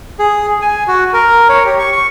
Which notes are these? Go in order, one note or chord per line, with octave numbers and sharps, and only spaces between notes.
G#4
G#5
F#4
A#4
C#5
G4
C#6
C#6